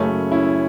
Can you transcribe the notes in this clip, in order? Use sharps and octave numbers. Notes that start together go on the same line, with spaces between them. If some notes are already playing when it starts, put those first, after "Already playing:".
Already playing: F#1 F#2 C#3 A3 C#4
C#4 E4